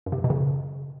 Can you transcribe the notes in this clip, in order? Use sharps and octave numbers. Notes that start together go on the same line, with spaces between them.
F#2
C3
F#2
B2
C#3